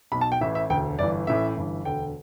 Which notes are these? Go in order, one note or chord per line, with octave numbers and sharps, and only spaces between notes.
B1 B2 B5
A5
G5
A1 A2 E3 E5
E5
E1 D2 D3 G5
G1 G2 E3 D5
A1 A2 E3 E5
G1 G2 E3
E1 D2 D3 G5